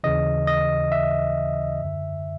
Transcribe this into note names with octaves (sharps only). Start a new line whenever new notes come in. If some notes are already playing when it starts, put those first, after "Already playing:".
D#2 C#3 E3 D#5
D#5
E5
F#2 D3